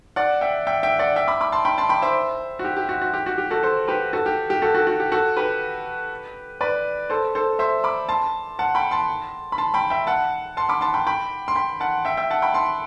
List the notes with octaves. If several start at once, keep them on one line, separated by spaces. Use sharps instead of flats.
D5 F#5
E5 G5
E5 G5
E5 G5
D5 F#5
E5 G5
B5 D6
B5 D6
A5 C6
G5 B5
A5 C6
G5 B5
C5 E5
F#4
G4
G4
F#4
F#4
G4
F#4
G4
F#4 A4
A4 C5
G4 B4
F#4 A4
G4
G4
F#4 A4
F#4 A4
F#4
G4
F#4 A4
G4 B4
B4 D5
A4 C5
A4 C5
C5 E5
B5 D6
A5 C6
F#5 A5
G5 B5
A5 C6
B5
A5 C6
G5 B5
E5 G5
F#5 A5
A5 C6
B5 D6
A5 C6
G5 B5
G5 B5
C6
G5 B5
F#5 A5
E5 G5
E5 G5
F#5 A5
G5 B5
A5 C6